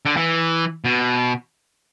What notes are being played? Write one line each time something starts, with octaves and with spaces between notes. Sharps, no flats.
D3
E3
B2